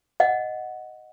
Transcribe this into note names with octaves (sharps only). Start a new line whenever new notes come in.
D#5 F#5